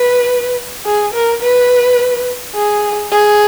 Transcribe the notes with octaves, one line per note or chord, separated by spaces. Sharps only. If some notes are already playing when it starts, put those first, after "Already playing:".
Already playing: B4
G#4
A#4
B4
G#4
G#4